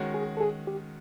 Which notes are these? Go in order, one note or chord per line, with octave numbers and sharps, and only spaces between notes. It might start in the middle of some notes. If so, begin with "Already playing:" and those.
Already playing: D#3 G#3 C#4 F#4
G#4
A4
G#4
G4